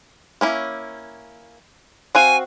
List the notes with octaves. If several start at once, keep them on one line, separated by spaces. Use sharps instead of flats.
A#3 C#4 E4
C4 F#4 F5 G#5